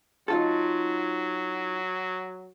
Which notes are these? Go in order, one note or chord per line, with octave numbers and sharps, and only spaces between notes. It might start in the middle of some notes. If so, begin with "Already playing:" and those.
F#3 D#4 F4 A4